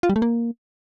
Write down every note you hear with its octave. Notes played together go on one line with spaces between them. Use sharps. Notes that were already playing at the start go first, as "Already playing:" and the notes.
F4
G3
A3
A#3